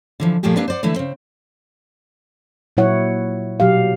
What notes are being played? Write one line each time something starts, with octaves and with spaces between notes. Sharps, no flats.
D3 E3 F3
A#2 F3 A3 A#3 G4 G#4
A#3 C4 D4 G4 B4 D5
C5 D5 F#5
D3 E3 A3 E4 E5
C#3 C4
A#2 F#3 E4 C#5 F#5
B2 F#3 G4 F5